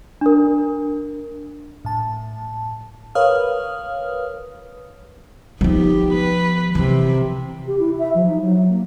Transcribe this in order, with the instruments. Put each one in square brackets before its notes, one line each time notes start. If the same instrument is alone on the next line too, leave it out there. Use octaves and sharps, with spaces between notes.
[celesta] D4 A#4
[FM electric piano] A2 A5
A#4 B4 C#5 F5 D#6 F6
[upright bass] F3 D#4 [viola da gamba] B3 G4
[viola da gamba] B4
[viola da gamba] C3 [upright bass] E3
[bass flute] G4
E4
E5
F3
D#4
F#3
A#3